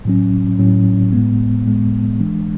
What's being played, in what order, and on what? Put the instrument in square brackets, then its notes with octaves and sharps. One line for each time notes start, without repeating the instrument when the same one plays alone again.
[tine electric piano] A2 F#3 C#4
A2 F#3 C#4
A2 G#3 B3
A2 G#3 B3
E3 G#3 D4